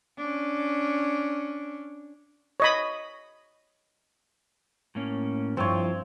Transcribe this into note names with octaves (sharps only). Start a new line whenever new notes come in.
C#4 D4
C#5 D#5 B5
A2 A#3 C#4
G2 F3 C4 E4 F4 C#5